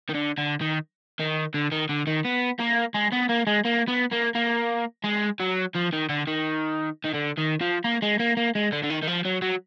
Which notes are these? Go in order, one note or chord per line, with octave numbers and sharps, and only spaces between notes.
D#3
D3
D3
D#3
D#3
D3
D#3
D3
D#3
B3
A#3
G#3
B3
A#3
G#3
A#3
B3
A#3
A#3
G#3
F#3
F3
D#3
D3
D#3
D#3
D3
D#3
F3
A#3
G#3
A#3
A#3
G#3
D3
D3
D#3
D#3
F3
F#3
F#3